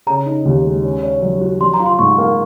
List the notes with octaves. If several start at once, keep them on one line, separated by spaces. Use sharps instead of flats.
C#3 A#5
D#4
D#2
G#3
C#4
C#5
F#3
F#4
F#3 C6
A#5
F4
C6
G#2 C#6
A#3